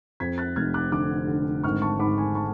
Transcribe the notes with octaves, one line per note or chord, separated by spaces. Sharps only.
F2 G#6 B6
F#6 A6
F1 F6 G#6
D6 F#6
D3 D6 F#6
D3
G#1 C#6 F6
A5 C#6
G#2 B5 D6
G#5 B5
A5 C#6